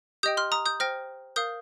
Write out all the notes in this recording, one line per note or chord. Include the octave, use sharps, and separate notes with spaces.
G4 D#5 G5 D#6 G6
C6 F6
A#5 D#6
D#6 G6
C5 G5 F6 A#6
A#4 F5 D#6 G6